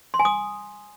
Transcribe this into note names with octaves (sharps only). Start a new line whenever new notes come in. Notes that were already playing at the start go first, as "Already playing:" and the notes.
C6
G#5
D#6